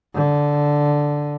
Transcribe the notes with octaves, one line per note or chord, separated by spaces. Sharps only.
D3